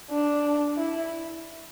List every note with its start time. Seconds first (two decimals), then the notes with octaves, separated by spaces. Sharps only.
0.10 D4
0.77 E4